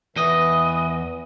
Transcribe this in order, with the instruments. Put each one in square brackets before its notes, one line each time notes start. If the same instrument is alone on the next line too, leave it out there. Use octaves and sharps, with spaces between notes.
[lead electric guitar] E2 D#5 [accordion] E3